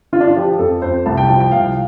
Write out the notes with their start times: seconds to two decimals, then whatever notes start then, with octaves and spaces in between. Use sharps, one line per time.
0.12 D3 F4
0.20 D4
0.28 F4
0.37 F3 G4
0.59 F2 A4
0.82 F2 C5
1.06 C2 A5
1.17 G5
1.28 F3 G5
1.40 G5
1.52 C2 F5